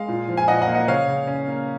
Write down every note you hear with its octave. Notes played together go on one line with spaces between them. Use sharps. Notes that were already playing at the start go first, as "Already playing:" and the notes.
Already playing: G#3 F5
A#2
F3
G#5
A#2 D#5 F#5
D#5 F#5
A#3
D#5 F#5
C#3 C#5 F5
C#3
C#4
A#3